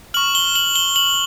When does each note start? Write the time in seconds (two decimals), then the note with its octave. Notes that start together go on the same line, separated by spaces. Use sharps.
0.14 C#6 F6 F#7
0.35 G7
0.56 F#7
0.76 G7
0.96 F#7